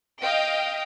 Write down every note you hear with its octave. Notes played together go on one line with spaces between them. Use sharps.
D#5 F5 G5